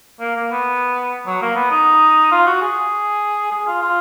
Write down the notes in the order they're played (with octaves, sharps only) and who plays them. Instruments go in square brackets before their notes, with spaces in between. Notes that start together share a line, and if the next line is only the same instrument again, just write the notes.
[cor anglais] A#3
A#3
B3
F#3
A#3
B3
D#4
F4
F#4
G#4
G#4
F4
F4